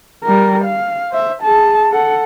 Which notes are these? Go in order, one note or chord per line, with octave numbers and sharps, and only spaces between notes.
G3 A#4
F5
C5 E5
G#4 A5
A4 F#5